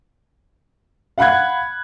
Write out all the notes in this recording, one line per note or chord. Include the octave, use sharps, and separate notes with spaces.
F5 F#5 B5 F#6 G#6